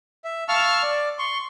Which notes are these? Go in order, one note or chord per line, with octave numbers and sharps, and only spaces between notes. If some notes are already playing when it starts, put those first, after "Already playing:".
E5
F5 A5 C#6 E6 F6
D5
C6 C#6